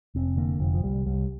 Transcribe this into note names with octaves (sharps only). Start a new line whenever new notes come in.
F1 C4
D3 A#3
F1 F3
F3
C2 G3
C2 G3